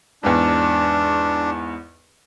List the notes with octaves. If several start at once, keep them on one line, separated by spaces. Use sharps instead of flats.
E2 G#2 D4